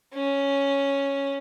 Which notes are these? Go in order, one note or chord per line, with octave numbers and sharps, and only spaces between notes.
C#4